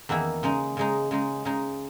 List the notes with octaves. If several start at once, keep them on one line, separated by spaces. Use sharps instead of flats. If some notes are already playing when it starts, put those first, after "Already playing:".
E2 D#3 A#3 E4
C#3 G#3 D#4
C#3 G#3 D#4
C#3 G#3 D#4
C#3 G#3 D#4